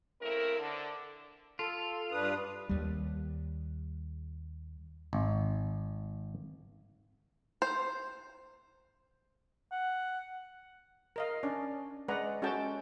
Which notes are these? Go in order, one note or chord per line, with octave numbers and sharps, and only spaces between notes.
C#3 A3 C4 E4 A#4
D3
F4 A4
G2 D4 B4 D#6
D#2 G3
G#1
C5
F#5
A#4 D#5 F5
C#4 D4 D5
G#3 B4 D5 F#5 A#5
G#3 C#4 F#4 A4 G5 A5